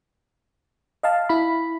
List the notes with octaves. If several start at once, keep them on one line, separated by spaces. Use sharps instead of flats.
D#5 F5 A5
E4 B5